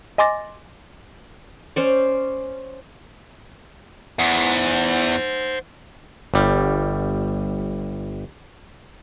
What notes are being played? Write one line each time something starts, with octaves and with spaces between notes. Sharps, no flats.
D#5 G#5 C6 D6 A6 A#6
C#4 C5 D5
E2 C5 F#5
G1 G3